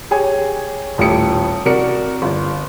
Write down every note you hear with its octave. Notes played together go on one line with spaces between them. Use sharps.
G4 G#4 C#5 G#5
D#1 A2 G4 D#6 C#7
C2 F#4 A#4 D5 C#7
G1